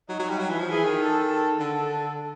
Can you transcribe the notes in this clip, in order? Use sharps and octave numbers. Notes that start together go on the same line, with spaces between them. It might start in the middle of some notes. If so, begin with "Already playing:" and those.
F#3 D#4
F#3
G3
F#3
E3
F3
E3 G#4
D#3
A4
A4
D3 A4